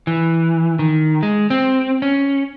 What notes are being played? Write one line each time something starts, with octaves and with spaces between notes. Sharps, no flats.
E3
D#3
G#3
C4
C#4